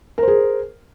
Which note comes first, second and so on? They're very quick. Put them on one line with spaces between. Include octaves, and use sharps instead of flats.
A#4 C5 G#4